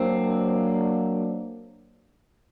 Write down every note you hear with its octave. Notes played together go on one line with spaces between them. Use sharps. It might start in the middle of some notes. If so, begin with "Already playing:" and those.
Already playing: F#3 A#3 C4 D4